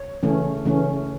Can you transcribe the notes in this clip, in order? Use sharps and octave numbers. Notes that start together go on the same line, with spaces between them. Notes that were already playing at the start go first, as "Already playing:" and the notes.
Already playing: C#5
C#3 E3 A3 C#4
C#3 E3 A3 C#4